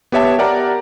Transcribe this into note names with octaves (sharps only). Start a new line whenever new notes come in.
B3 G4 C#5 E5 A5
G4 A#4 D5 F#5 A#5